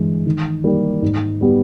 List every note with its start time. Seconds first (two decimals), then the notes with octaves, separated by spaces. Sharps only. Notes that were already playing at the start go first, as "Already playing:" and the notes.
Already playing: G2 E3 G#3
0.26 D#3
0.64 G3 A#3 D#4 G4
1.02 G#2
1.41 G3 B3 G4